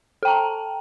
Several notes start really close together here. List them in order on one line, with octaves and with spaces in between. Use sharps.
A4 G5 A#5 A5